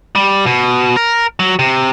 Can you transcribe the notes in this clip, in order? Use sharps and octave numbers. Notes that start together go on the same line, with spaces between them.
G3
B2
A#4
F#3
C3